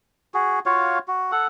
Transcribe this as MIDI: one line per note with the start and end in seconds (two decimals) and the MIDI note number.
0.34 0.60 66
0.34 0.60 68
0.66 0.99 65
0.66 0.99 66
0.66 0.99 73
0.66 0.99 77
1.08 1.32 66
1.32 1.47 69
1.32 1.47 78